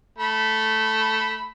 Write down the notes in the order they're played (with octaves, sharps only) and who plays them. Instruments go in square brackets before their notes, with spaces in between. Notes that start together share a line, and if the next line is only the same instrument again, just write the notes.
[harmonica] A3 B5